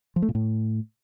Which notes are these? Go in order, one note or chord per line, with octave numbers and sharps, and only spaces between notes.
F3
A3
A#2
A2